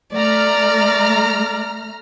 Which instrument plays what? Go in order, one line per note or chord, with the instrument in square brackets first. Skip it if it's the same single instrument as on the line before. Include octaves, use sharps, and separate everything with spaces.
[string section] A3 A#5 F6 [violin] D5